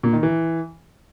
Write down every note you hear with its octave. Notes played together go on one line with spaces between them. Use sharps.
A#2
D#3
E3